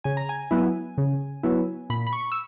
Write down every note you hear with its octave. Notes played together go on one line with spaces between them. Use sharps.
C#3 G#5
A#5
G#5
F#3 B3 E4
C#3
F#3 B3 E4
A#2 B5
B5
C#6
E6